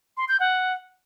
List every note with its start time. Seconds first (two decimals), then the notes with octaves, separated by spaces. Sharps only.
0.17 C6
0.29 G6
0.40 F#5